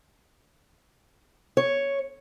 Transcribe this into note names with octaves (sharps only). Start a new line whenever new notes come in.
C#5